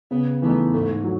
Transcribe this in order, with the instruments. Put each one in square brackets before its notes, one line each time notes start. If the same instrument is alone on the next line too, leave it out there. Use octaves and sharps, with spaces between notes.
[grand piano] C#3 [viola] B3
[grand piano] E3 A3 D#4 [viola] B3
[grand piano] G#2 [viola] A3
[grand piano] F#3